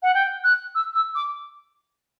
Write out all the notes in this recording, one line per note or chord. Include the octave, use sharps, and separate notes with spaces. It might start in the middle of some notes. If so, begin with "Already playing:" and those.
F#5
G5
F#6
E6
E6
D6